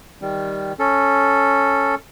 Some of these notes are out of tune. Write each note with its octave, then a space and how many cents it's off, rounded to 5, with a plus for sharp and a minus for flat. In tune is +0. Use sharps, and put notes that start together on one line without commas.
D#3 +10 G3 +0
C#4 +0 A4 +0